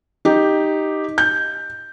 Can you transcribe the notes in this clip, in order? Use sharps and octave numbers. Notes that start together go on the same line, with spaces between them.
D#4 G4
G6